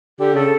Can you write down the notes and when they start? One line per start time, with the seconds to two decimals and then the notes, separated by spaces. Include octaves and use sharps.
0.19 D3 G4
0.35 C#3 A4